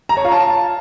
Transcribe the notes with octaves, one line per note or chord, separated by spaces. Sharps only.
A#5
C#5
F4
A5